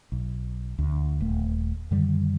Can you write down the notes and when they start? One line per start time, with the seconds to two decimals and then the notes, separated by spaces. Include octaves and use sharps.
0.12 B1
0.79 D2
1.21 D#1 A3
1.91 F#2 D3 D#3 G3